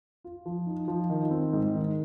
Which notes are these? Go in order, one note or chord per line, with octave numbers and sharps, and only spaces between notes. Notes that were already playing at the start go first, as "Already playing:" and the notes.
F4
F3
D#4
F3
D#3
C4
G#2
D#3